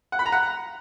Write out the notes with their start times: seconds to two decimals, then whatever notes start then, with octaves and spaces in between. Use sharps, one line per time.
0.12 F#5
0.19 B5
0.26 A#5
0.32 F#5